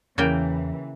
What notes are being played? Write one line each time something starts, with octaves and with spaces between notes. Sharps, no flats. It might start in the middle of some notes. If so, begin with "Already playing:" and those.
E2 C#3 E3 A#3 G5